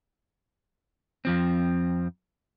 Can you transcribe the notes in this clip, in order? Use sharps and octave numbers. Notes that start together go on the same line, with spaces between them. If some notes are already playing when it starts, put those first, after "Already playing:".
F2 F3 C4